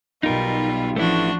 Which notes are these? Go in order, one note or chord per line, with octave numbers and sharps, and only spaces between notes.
B1 B2 G3 D#4 F4 A#4
A1 F3 A3 D4 E4 F#4